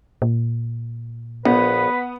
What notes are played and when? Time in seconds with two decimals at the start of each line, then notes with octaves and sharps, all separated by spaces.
0.22 A#2
1.45 A#1 B3 B4